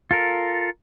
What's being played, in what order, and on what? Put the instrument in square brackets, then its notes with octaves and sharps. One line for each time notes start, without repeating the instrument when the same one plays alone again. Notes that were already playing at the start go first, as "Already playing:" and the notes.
[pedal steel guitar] F4 A4 A#4